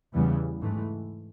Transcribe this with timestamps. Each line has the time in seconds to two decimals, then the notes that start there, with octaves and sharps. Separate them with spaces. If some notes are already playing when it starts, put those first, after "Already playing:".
0.14 E2 C#3 E3 G3 B3
0.60 G#2 E3 A3